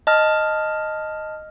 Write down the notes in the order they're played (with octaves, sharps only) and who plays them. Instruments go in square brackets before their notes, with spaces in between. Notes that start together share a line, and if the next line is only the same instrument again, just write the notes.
[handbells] D#5 A5 F6